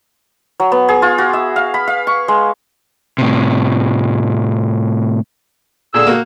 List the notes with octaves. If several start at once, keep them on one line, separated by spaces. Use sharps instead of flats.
F#3
B3
G#4
F4
F#4
E5
F5
B5
F5
C#6
G#3
A2 C3
A#2 D3 G#4 E6
A#3 F#4